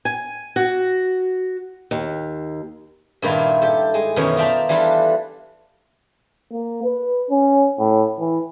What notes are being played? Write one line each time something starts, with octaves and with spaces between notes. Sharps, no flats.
G#5
F#4
D#2
G2 A#2 D#3 E4 F4
G4 A4
G#3
F#2 B2 D#3 E3 C#4
F4 D5 E5 G5 A5 A#5
E3 G3 D4 F4 A4
A#3
B4
C#4
A2
E3